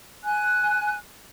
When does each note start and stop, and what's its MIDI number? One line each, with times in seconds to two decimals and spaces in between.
0.24 0.96 80
0.24 0.96 90